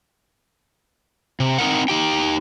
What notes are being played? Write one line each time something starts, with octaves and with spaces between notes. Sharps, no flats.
C3
C4 D#4 A#4 F#5
D#4 G4 G5